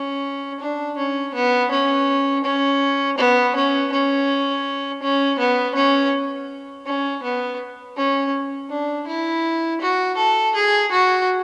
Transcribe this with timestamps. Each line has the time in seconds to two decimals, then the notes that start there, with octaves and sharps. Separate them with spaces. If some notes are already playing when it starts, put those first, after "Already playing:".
Already playing: C#4
0.60 D4
0.97 C#4
1.34 B3
1.71 C#4
2.44 C#4
3.18 B3
3.55 C#4
3.92 C#4
5.02 C#4
5.39 B3
5.75 C#4
6.86 C#4
7.23 B3
7.97 C#4
8.70 D4
9.07 E4
9.81 F#4
10.17 A4
10.55 G#4
10.91 F#4